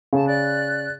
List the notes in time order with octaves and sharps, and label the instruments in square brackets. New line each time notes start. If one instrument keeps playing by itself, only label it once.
[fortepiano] C#3 [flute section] A5
[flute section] D5 F#6